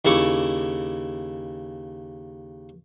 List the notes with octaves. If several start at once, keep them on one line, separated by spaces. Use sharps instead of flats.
D#2 C#3 E4 C#6 D6